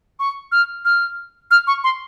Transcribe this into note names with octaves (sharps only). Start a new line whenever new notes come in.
C#6
F6
F6
F6
C#6
C6